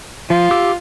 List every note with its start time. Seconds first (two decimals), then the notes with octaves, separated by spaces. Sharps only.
0.30 F3 F4
0.51 G4 D6 E6